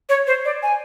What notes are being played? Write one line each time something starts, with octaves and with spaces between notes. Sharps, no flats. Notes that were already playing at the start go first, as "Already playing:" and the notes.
C#5
C5
D5
G#5